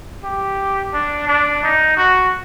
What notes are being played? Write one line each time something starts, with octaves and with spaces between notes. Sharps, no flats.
G4
D4
D4
D#4
F#4